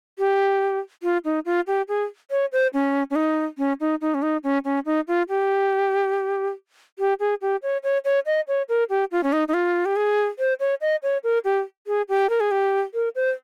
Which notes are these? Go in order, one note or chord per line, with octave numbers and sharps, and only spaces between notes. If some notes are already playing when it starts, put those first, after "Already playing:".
G4
F4
D#4
F4
G4
G#4
C#5
C5
C#4
C#4
D#4
C#4
D#4
D#4
C#4
D#4
C#4
C#4
D#4
F4
G4
G4
G#4
G4
C#5
C#5
C#5
D#5
C#5
A#4
G4
F4
C#4
D#4
D#4
F4
G4
G#4
C5
C#5
D#5
C#5
A#4
G4
G#4
G4
A#4
G#4
G4
A#4
C5